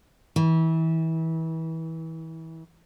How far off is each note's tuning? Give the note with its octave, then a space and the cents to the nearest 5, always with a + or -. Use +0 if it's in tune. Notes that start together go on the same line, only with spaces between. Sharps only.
E3 -30